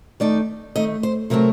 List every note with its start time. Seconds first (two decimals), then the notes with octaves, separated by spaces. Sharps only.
0.20 D#3 A3 D#4 D5
0.76 D#3 A3 D#4 D#5
1.03 C5
1.30 C3 F#3 A3 C4 A#4